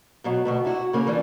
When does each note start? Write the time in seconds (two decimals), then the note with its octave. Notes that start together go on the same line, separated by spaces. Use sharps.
0.24 F#2 B2 F#3
0.45 D2 B2 B3
0.65 C3 E4 F#4
0.93 C#3 A#3 C#4
1.07 E3 G3 D4 F4